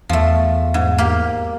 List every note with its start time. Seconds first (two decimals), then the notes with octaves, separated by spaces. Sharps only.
0.09 E2 F3 A3
0.74 G#2
0.98 A#3 G4